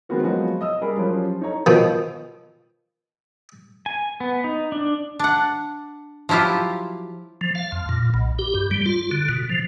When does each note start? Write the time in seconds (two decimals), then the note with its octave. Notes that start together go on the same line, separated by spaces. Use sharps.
0.09 D#3 G#3 B3 C4 F#4 A#4
0.23 F3 F#3 G#3 B3 F#4
0.61 D#5 D#6 E6
0.81 G3 G#4 A#4 B5
0.97 F3 F#3 C#4 F4 G4
1.41 D#4 A4 C#5 A#5
1.66 B2 D#3 F3
3.86 G#5
4.20 B3
4.44 D#4
4.72 D4
5.19 D4 F#5
6.29 F3 F#3 E4 F4 G4
7.41 F3
7.55 F5
7.72 F2
7.89 A#2
8.14 B1
8.39 G4
8.54 G2
8.71 G3
8.86 F4
9.11 D3
9.29 B2
9.49 F3